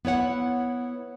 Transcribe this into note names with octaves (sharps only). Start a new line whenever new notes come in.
B3 E4 C#5 F#5